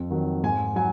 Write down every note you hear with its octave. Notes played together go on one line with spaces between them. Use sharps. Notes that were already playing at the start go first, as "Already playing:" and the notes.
Already playing: F2
D#3 F#3
G#2 G#5
F#3 G#5